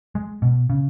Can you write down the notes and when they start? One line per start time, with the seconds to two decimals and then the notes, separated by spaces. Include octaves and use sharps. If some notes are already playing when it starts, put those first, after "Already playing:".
0.15 G#3
0.42 B2
0.70 C#3